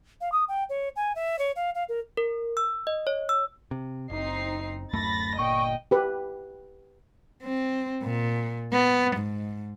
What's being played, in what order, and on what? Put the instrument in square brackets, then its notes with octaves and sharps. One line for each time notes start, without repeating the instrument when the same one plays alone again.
[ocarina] F5
D#6
G5
C#5
G#5
E5
C#5
F5
F5
A#4
[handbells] A#4
E6
D#5
C#5
E6
[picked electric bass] C3
[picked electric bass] F#1 [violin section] C4 D#4 C7
[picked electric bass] D1 F#2 A3 [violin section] B5 A6 A#6
[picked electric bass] G1 A#2 [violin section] D#5 G5 [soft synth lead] C#6
[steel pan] G4 B4
[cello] C4
A#2
B3
G#2